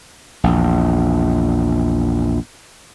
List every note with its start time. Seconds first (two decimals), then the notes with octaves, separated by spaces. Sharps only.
0.44 A#1 E2